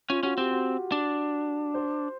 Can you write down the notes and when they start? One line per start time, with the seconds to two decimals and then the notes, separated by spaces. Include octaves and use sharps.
0.10 C#4 F4
0.23 C#4 F#4
0.38 C4 G4
0.51 F#4
0.92 D4
1.74 C5